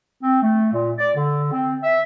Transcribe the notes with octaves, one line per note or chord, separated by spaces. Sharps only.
C4
A3
A#2
D5
D3
C4
E5